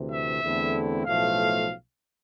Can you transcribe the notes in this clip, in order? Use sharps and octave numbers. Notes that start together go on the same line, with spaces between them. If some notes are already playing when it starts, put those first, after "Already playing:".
Already playing: D2 C3 E3
E5
E2 D3 A3 C4 E4
B1 A2 F3 A3 F5